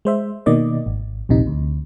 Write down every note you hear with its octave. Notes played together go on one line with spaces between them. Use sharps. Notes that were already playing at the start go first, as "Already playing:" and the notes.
G#3 C5 E5
B2 D#3 A#3 D5 D#5
G#1
A#1 D#2 C3 D#4
D2